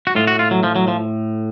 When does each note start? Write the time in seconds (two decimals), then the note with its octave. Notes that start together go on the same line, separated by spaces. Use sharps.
0.07 F#4
0.16 A2 F4
0.27 F#4
0.39 F4
0.51 F#3
0.63 F3
0.76 F#3
0.88 F3